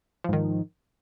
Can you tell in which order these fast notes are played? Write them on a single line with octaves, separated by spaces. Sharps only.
F3 G#2 D#3